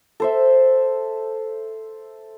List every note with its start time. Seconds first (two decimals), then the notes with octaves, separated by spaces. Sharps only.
0.20 A4 C5 E5